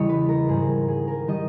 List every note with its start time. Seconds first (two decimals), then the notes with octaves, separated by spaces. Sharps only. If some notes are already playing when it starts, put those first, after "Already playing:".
Already playing: E2 C#3 E3 G3 C#5 D#5
0.09 B4
0.29 A#4
0.49 G#2 D#3 G3 G#4
0.88 G#4
1.08 A#4
1.28 D#3 G3 D#5